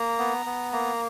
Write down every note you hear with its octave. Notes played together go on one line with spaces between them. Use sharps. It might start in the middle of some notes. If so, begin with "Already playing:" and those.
Already playing: A#3 A#5
B3
B3
A#3 A#5